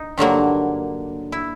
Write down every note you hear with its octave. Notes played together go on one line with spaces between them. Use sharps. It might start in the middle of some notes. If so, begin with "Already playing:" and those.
Already playing: D#4
G2 D3 F#3 A#3
E4